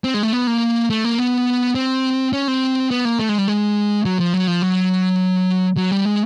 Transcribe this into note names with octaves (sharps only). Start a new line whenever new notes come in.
C4
G#3
A3
B3
A#3
A3
A#3
B3
C4
C#4
C4
B3
A#3
A3
G#3
G3
G#3
F#3
F3
F#3
F3
F#3
F#3
G3
G#3